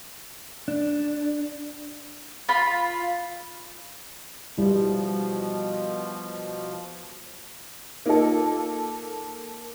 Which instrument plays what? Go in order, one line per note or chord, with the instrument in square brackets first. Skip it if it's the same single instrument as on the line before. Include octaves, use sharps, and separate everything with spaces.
[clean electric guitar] D4
[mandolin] F4 B5
[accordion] B2 F3 [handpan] G3 E4
[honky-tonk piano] A#3 A4 [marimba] D#4 F4 D#5